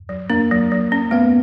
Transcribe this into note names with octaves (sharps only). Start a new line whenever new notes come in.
F#3
A#3 D4
F#3
F#3
C#4
A3 B3